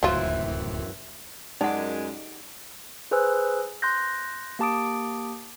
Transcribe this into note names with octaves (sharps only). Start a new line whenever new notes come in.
D1 C#2 F#2 A2 E3 F#3 C4 F4
F#2 G#3 D#4 F#5 D6
G#4 B4 C5 G#5 E6 F#6
C6 F#6 G6 A#6
A#3 G4 A5 D6 D#6 D7